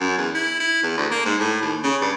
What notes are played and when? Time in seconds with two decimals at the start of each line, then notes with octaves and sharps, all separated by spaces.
0.01 F#2
0.18 E2
0.35 E4
0.60 E4
0.83 E2
0.97 D2
1.12 A#3
1.25 G#2
1.40 A2
1.62 D#2
1.84 C#3
2.02 G2